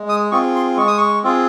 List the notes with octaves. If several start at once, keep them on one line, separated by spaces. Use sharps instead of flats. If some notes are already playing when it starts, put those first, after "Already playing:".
Already playing: G#3
D#6
C4 F4 G#4 C#6
C6
G#3 C#6
D#6
C#6
C4 F4 G#4